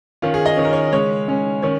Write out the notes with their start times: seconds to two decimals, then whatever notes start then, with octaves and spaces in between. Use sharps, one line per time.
0.22 D#3 C#4 F4
0.34 G#4
0.46 D#5
0.57 D#3 C#4 C#5
0.65 A#4
0.73 C#5
0.92 C#3 G#3 C#4 C#5
1.28 C#3 G#3 C#4
1.62 D#3 C#4 C#5